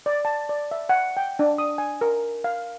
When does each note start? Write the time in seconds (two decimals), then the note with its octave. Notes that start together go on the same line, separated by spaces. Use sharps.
0.06 D5
0.25 A5
0.49 D5
0.71 E5
0.89 F#5
1.17 G5
1.39 D4
1.58 D#6
1.78 G#5
2.01 A#4
2.44 F5